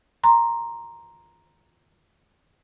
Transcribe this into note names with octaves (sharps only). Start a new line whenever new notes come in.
A#5 C6